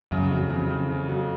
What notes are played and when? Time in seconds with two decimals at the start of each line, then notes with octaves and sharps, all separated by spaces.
0.12 F#2 C#3
0.31 F2 F#3
0.50 F2 C#3
0.70 C#3
0.89 C#3
1.09 F#3